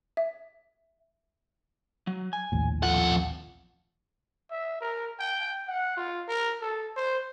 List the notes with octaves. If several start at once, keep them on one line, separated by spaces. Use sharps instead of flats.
E5
F#3
G#5
A#1 D#2 A2
F2 F4 A4 F#5
E5
A#4
G5
F#5
F4
A#4
A4
C5